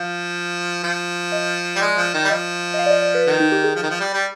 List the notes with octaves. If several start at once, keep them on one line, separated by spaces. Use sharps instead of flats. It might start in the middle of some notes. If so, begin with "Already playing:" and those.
Already playing: F3 F5
F3
D#5
G3
G#3 D5
F3
D#3
G3
F3 D#5
D#5
F5
D5
D#5
D5
B4
D#3
D#4
G4
G#4
F3
D#3
F3
G3
G3